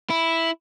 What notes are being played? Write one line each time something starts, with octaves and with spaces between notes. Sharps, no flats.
E4